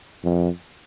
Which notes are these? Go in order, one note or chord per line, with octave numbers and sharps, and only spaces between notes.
F2